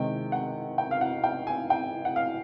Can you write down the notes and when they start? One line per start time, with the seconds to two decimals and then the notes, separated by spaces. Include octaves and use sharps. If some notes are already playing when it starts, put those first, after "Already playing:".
Already playing: C3 D#3 G#3 G5
0.32 F#5
0.78 G5
0.91 F5
1.01 F#5
1.24 G5
1.47 G#5
1.70 G5
2.05 F#5
2.16 F5